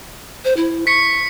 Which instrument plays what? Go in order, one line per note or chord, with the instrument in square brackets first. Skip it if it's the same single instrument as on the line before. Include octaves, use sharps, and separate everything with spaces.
[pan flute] C5
E4
[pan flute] C#6 [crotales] B6 C#7